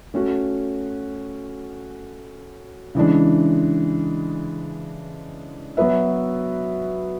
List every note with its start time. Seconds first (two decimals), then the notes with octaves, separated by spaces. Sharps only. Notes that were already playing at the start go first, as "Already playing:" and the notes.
0.14 A3 C#4 F#4
2.95 C#3 E3 G#3 D4
5.77 F#3 B3 F#4 B4 E5